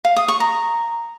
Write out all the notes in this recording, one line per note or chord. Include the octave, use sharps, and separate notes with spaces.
F5
D#6
C#6
A#5